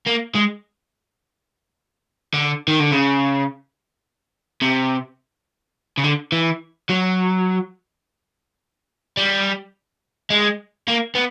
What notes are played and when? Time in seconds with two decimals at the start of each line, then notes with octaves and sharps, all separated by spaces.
0.07 A#3
0.35 G#3
2.34 D3
2.68 D#3
2.80 D3
2.92 C#3
4.62 C3
5.98 C#3
6.04 D3
6.32 E3
6.89 F#3
9.17 G3
10.30 G#3
10.88 A#3
11.15 B3